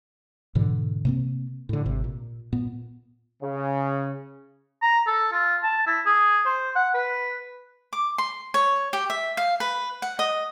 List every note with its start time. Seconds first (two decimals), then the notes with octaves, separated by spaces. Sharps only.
0.55 G#2 B2 D3 E3
1.05 C3 A#3 C4
1.69 A2 D3
1.85 G#1 C3
2.04 A#2
2.53 A#2 B3
3.43 C#3
4.82 A#5
5.07 A4
5.32 F4
5.63 A5
5.87 E4
6.06 G#4
6.46 C5
6.76 F#5
6.95 B4
7.93 D6
8.18 C6
8.54 C#5
8.93 G4
9.10 E5
9.37 F5
9.60 B4
10.02 F#5
10.19 D#5